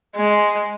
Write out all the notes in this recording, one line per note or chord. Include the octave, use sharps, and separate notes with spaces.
G#3